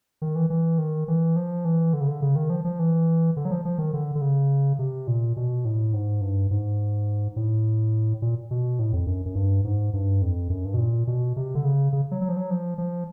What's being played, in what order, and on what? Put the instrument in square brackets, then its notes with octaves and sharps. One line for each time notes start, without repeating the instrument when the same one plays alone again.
[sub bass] D#3
E3
E3
D#3
E3
F3
E3
D3
C#3
D3
C#3
D#3
F3
F3
E3
D3
F#3
F3
F3
D#3
D3
D3
C#3
C3
A#2
B2
A2
G#2
G2
G#2
A2
A#2
B2
A2
F2
F#2
F#2
G2
G#2
G2
F2
F#2
G2
B2
A#2
B2
C3
D3
C#3
C#3
F#3
F#3
F3
F#3
F3
F3